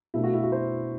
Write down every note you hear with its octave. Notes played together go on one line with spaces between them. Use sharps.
B2 A3 D4 E4
F#4
E4
F#4
C5